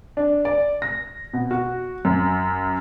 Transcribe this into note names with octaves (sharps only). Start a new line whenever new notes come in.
D4
D5
A#6
B2
F#4
F#2